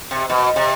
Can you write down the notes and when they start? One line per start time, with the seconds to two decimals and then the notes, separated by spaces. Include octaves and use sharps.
0.11 C3
0.30 B2
0.56 C3